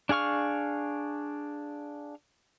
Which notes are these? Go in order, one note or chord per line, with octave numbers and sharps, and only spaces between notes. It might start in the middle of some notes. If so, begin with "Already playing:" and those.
D4 G#4 F5 C#6 F6